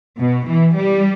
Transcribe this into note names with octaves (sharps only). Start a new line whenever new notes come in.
B2
E3
G3